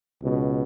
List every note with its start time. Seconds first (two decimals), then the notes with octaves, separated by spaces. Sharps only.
0.21 C#2 B2